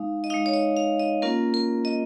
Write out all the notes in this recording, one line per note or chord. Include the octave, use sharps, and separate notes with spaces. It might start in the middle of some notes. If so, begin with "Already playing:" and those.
Already playing: G#3 D#4 F5
D#5
G#3 D#4 F5
C#5
D#5
F5
D#5
A#3 C#4 F4 A#4
A#4
D#5